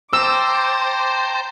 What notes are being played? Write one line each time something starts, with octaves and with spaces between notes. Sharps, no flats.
C5 G5 A5 A#5 D6 E6